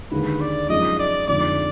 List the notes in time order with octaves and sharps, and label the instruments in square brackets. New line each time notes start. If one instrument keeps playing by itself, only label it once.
[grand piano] D#2 D3 G#3 [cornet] B4
[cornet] D5
[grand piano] F#2 F3 G#3 D#4 [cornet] D#5
[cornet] D5
[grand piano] F2 D3 G#3 D#4 [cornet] D5